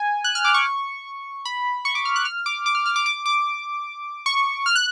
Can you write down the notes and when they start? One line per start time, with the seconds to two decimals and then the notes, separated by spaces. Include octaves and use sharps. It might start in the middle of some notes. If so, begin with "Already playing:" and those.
Already playing: G#5
0.24 F#6
0.35 F6
0.45 D6
0.54 C#6
1.45 B5
1.85 C#6
1.95 D6
2.05 F6
2.16 F#6
2.25 F6
2.46 D6
2.66 D6
2.75 F6
2.86 F6
2.96 D6
3.06 D6
3.26 D6
4.26 C#6
4.66 F6
4.75 F#6